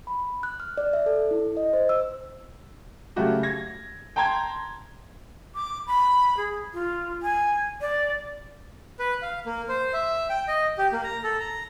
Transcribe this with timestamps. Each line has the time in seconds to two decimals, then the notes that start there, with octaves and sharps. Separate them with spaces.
0.07 B5
0.43 F#6
0.60 F6
0.77 D5
0.93 E5
1.06 A4
1.31 E4
1.57 D#5
1.73 C5
1.89 E6
3.16 C#3 F#3 A3 F#4 G4
3.43 G#6 A#6
4.16 G5 A5 A#5 C6 G#6
5.54 D6
5.87 B5
6.37 G#4
6.74 F4
7.23 G#5
7.81 D5
8.99 B4
9.22 F5
9.46 A#3
9.69 C5
9.94 E5
10.30 G5
10.48 D#5
10.78 G4
10.93 A#3
11.04 A#5
11.24 A4
11.40 A#5